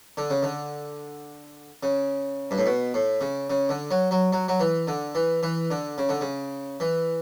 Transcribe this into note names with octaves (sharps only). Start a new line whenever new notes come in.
D3
C#3
D3
C#3
G2
A2
B2
A2
C#3
C#3
D3
F#3
F#3
F#3
F#3
E3
D3
E3
E3
D3
C#3
D3
C#3
E3